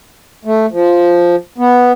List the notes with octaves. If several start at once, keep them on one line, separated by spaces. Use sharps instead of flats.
A3
F3
B3